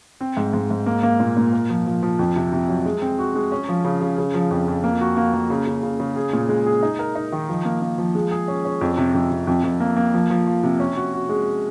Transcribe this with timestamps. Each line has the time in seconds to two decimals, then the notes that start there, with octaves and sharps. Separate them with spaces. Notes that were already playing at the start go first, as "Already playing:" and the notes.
0.21 C4
0.37 G#2
0.53 G#2
0.70 G#2
0.86 A#3
1.03 A#3
1.20 A#2
1.37 A#2
1.53 A#4
1.70 F3
1.86 F3
2.03 F3
2.19 F2
2.36 C3
2.53 C3
2.69 F#3
2.86 G#3
3.02 C4
3.19 F#4
3.35 G#3
3.52 C#4
3.69 F3
3.85 C#3
4.02 C#3
4.18 C#3
4.34 F3
4.51 F2
4.68 F2
4.84 A#3
5.01 F#4
5.17 A#3
5.33 A#3
5.50 C#3
5.67 C#3
5.83 C#3
6.00 C#3
6.16 G#4
6.33 A#2
6.49 G#3
6.66 G#4
6.82 D#4
6.99 A#4
7.15 D#4
7.32 D#3
7.49 F3
7.65 A#3
7.82 A#3
7.98 F3
8.15 G#3
8.31 G#4
8.48 C#4
8.65 C#4
8.81 F2
8.98 C3
9.14 F2
9.31 C3
9.47 F2
9.64 F2
9.80 A#3
9.97 A#3
10.14 F3
10.30 F3
10.47 F4
10.63 C3
10.80 C#4
10.96 F#4
11.14 F#4
11.29 G#3